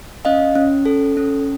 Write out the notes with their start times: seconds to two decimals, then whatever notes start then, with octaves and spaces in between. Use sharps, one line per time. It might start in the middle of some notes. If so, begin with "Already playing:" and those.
0.25 C#4 D#5 F5
0.55 C#4
0.86 A4
1.17 C#4